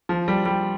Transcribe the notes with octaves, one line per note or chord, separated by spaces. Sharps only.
F3
G3
G3